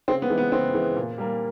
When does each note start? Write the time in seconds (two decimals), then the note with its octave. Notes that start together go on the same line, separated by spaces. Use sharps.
0.08 C#3 C4
0.22 B3
0.30 E3 G#3
0.38 B3
0.52 C#3 C4
0.74 E3 G#3
0.97 A#2
1.18 G3 A#3